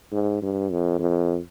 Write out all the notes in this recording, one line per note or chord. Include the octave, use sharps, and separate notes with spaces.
G#2
G2
F2
F2